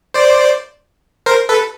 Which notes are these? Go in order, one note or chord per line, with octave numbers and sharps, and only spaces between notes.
C5 D5
A#4 C5
A4 B4